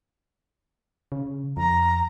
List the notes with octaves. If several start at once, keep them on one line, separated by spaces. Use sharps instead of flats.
C#3
F2 A#5